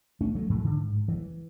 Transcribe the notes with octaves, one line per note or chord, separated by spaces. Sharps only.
A3 C#4
F#3 A3
G#2 E3
D3
E3